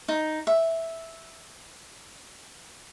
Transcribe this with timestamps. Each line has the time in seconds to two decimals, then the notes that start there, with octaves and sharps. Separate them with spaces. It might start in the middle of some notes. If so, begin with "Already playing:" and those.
0.08 D#4
0.47 E5